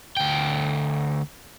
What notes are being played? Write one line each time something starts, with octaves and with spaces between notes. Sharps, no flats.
D2 G5